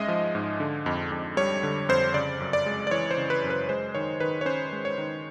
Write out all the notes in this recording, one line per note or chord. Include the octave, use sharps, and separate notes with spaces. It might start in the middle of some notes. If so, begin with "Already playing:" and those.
Already playing: G#2 G#3 C#4 D#5 E5
F3
G#2
D3
F2
F2
G3 C#5
D3
F2 C5
C#3 D5
F#2
D5
G#3
D5
E3 C#5
C5
C#3
B4
F#2
B4
G#3 C5
D#3 C#5
D#3 B4
C#5
C#4 C5
G#3
C#5
D#3